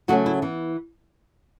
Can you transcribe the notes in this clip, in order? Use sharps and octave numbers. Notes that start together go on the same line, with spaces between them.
C#3 F#3 A3 C#4 F#4
E4
E3 B3